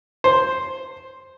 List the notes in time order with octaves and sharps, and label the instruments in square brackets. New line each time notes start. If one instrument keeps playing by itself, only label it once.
[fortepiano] C5